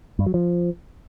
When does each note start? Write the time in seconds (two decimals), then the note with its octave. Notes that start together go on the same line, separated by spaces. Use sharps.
0.19 G2
0.26 F#3
0.34 F3